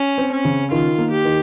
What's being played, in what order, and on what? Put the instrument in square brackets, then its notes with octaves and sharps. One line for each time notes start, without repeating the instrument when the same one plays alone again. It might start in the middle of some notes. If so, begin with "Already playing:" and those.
Already playing: [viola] C#4
[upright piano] C4
[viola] C#4
[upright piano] C#3
[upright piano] D#3 [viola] F4
[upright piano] A#3
[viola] G4
[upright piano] D#3